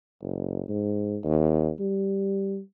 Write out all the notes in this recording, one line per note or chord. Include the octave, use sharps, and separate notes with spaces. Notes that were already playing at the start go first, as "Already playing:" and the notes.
F#1
G#2
D#2
G3